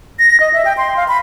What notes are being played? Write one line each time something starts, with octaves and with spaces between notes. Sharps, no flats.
A#6
D#5
E5
G5
C6
F5
B5